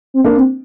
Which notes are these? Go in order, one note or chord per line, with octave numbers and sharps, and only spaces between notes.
C4
A#3 D4
C4